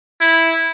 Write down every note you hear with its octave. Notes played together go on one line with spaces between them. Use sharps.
E4